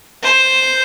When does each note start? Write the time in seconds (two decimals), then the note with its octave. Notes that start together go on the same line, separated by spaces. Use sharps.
0.23 C5